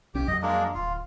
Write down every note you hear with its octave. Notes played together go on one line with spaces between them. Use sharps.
B1 C#4 G4
F2 F#3 D#5
G#3 A#3 D4
D1 F4